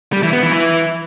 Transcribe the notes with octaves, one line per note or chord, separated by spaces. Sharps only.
G3
E3
B3
E3
E3